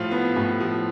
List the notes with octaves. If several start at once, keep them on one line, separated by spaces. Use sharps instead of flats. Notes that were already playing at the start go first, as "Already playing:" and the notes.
Already playing: A2 F3 F4
B3
A2
F3